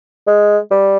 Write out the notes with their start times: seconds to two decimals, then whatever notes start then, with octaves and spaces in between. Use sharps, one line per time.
0.27 G#3
0.71 G3